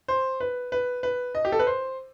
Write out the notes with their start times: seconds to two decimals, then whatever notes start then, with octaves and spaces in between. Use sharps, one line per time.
0.08 C5
0.40 B4
0.72 B4
1.03 B4
1.35 D#5
1.45 G4
1.52 A4
1.59 B4
1.67 C5